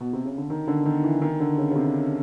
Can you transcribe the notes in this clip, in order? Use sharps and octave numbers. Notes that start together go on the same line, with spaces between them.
B2
C3
C#3
D3
D#3
D3
D#3
E3
D#3
D3
C#3
C#3
C3